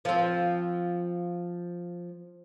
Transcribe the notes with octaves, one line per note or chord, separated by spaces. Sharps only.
F3 C4